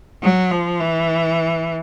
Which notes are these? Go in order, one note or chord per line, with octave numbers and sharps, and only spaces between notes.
F#3
F3
E3